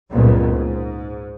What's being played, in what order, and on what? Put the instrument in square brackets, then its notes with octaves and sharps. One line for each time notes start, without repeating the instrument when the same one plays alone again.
[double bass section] F#1 C#2 G2 A#2 B3
G#2